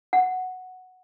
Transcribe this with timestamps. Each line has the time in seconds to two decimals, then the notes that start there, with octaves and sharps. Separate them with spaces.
0.13 F#5